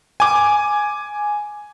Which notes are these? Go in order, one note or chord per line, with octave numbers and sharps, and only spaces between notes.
G#5 D6